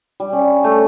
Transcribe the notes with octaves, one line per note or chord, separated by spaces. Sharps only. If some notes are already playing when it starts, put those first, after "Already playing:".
G3
C#4
A3